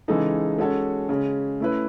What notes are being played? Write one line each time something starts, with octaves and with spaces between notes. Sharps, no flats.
C#3 E3 G#3 D#4 A4
G#3 C#4 F#4 A4 C#5
C#3 G#3 C#4
A3 C#4 E4 B4